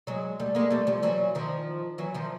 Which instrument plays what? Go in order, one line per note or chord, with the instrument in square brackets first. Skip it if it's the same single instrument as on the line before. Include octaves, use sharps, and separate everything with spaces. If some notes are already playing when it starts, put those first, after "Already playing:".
[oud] F#3 G#3
G3 A3
G#3 A#3
G3 A3
F3 G3
E3 F#3
D#3 F3
E3 F#3
D#3 F3